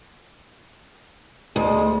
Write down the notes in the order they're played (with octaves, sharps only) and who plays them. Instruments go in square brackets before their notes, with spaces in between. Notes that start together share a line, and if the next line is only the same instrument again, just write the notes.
[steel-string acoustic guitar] D2 [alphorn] G#3